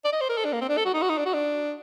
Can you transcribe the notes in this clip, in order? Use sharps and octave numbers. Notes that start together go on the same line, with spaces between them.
D5
D#5
C5
A#4
A4
D4
A#3
C4
D4
A4
F#4
D#4
F#4
D#4
D4
F#4
D4